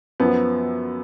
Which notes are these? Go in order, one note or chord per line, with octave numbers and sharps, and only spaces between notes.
F#2 F3 B3